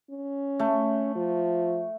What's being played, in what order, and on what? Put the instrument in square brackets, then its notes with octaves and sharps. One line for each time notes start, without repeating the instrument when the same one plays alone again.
[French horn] C#4
[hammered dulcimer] A3
[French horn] F3